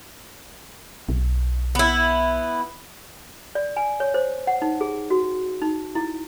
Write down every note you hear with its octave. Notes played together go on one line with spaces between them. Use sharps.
B1
B3 E4
D5
G#5
C#5
C5
F#5
D#4
G#4
F#4
D#4
E4